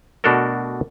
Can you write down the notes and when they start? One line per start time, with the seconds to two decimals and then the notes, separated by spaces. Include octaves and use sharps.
0.24 B2 A3 D4 F#4 A4 A#4